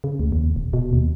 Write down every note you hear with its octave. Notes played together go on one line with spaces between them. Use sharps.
C#3
D2
D#2
D#1
B2
D#2